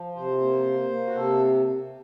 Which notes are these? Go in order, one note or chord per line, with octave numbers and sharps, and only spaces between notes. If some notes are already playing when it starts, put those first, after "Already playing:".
Already playing: F3
C3 C5
A#3
A#3
A#3
F#4
C3 A4